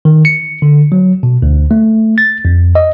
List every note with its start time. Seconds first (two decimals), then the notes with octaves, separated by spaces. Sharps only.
0.05 D#3
0.25 C#7
0.62 D3
0.92 F#3
1.23 B2
1.42 D2
1.71 A3
2.18 A6
2.45 F2
2.75 D#5